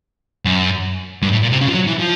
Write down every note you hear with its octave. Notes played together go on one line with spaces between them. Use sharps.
F#2
G2
A2
A#2
C3
C#3
F3
F#3
E3
F3